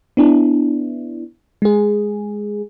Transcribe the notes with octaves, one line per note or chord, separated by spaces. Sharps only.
B3 D4 E4
G#3 G#4